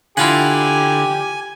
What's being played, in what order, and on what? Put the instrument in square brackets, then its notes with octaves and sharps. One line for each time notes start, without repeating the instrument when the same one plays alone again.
[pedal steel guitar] D3 [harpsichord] E4 F4 F#5 [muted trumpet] G4 [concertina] G#5